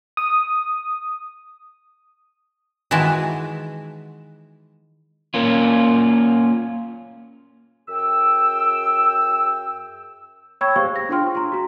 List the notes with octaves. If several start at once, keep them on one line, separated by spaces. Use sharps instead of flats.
D#6
D#3 E3 G#3 E4 F#4 A5
A#3 C#4 F4
F#2 G#4 G5 E6
C#5 G5 B5 C#6 E6 G#6
G4 G#4 C5 F5 C#6
A#6
D4 F4 G#4 G5 C6 F6
A#5 C6
F#4 A#5